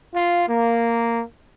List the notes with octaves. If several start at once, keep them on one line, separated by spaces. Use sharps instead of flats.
F4
A#3